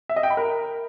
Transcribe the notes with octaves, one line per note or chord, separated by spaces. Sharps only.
E5
D#5
G5
B5
A#4